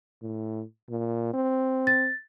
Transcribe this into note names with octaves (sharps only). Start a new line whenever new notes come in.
A2
A#2
C4
A6